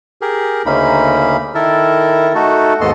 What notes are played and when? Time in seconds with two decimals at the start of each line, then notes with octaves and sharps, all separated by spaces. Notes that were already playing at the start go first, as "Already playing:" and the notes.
0.22 G4 G#4 A#4
0.66 D2 C#3 A#3 C#4 D#4 B5
1.55 D#3 E4 A4 A#4
2.35 A3 D#4 F#4 A4
2.81 D#2 G#2 B3 A4 D#5 C6